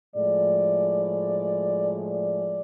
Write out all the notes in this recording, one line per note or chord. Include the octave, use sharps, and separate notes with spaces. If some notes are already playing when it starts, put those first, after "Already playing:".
A2 F3 G#3 D5
D5